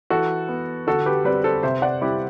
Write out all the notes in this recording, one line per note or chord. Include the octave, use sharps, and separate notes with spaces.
E3 F#4 A4
B3
D3 F#4 A4
G4 B4
G3 C4 B4 D5
A4 C5
C3 C5 E5
D5 F#5
G3 C4 E4 G4